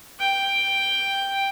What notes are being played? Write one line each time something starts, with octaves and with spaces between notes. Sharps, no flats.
G5